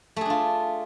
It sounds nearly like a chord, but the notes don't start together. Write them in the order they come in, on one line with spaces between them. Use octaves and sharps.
A3 G#4 D4 F4